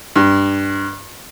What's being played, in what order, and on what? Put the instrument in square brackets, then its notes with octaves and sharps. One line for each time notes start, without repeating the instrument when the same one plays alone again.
[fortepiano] G2